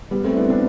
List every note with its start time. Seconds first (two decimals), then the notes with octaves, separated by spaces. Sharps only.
0.11 G3 B3
0.24 A3 C4
0.33 E4
0.37 B3 D4
0.50 B3 D4